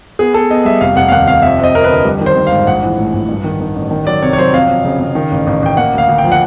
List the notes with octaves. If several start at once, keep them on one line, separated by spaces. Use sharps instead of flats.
B3 G#4
B3 A4
B3 D#5
G3 E5
F1 F5
F1 F#5
F5
D#2 F#5
F1 F5
F2 E5
C4 D#5
F2 A#4
B4
D3
G3
D#3
C5
D#3
F5
G#2
A#1 F#5
E3
A2
A#1
G2
D#3
D#3
A1
D#3
F#3 D5
C3 C#5
C#5
F#3 C5
F2 F5
F2
C#3
C#3
D#3
A1
A1
A1 G5
A#3 F#5
D2 F5
D2
G5
F3
F#5